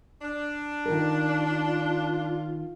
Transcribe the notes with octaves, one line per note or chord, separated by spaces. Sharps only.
D4
D#3 F4 A#4